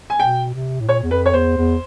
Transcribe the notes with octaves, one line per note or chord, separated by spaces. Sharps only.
G#5
B2 G5
C3
A2
A#2 C#5
E2
F2 B4
C#5
E2 C5
E2